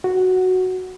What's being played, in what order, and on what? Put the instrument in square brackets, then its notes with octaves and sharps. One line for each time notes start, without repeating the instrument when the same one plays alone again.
[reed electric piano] F#4